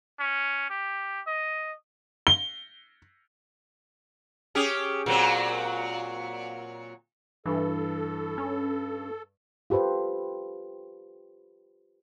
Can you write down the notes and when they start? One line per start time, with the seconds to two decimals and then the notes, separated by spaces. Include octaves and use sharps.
0.20 C#4
0.70 G4
1.27 D#5
2.27 G7
4.55 C#4 G4 G#4
5.06 A#2 F#3 C4
7.46 G2 E3 A4
8.38 C#4
9.70 F4 G4 A4 B4 C5